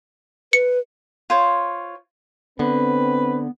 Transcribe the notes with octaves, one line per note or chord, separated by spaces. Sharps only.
B4 C#7
F4 C5 C#5
D3 B3 C4 B4